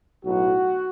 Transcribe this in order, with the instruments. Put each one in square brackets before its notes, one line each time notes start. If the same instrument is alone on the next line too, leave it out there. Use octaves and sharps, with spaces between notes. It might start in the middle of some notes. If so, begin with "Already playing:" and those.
[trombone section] B1 A2 F#3 F#4